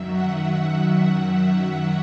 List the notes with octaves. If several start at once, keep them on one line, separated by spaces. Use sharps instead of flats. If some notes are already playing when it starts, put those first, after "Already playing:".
Already playing: F#2 D#3 F#3 E5
F#5